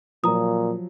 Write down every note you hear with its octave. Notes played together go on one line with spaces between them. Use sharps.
A#2 F3 F#3 A#5 D#6